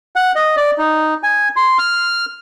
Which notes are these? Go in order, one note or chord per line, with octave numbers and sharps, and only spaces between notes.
F#5
D#5
D5
D#4
G#5
C6
F6